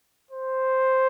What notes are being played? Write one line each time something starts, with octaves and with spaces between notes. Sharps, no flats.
C5